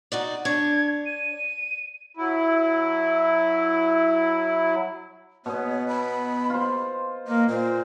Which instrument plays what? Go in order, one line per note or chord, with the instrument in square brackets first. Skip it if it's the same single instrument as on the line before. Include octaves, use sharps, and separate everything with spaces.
[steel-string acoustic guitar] D#4 F#4 D5
[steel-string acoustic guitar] D4 C#5 [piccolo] G#6
[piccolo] D#7
[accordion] F#3 E4
[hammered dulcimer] B2 D#5 [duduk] B3 [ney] C#5
[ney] B5
[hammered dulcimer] F4 C5
[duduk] A#3 [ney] D#5
[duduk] A#2 [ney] C5